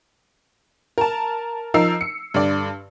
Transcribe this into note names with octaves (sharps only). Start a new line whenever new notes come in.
A#4 A5
F3 D#4 A#4 E6 C7
C#7
G2 D3 D5